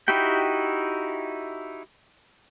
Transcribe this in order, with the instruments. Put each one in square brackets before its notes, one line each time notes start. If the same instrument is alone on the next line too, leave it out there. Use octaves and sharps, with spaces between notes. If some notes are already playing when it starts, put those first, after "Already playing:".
[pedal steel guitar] D#4 E4 F#4 G4 G5